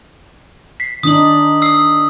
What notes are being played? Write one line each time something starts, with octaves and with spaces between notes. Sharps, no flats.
B6 C7
D#3 D4 D#4 D#6 F#7
D#6 E6 C7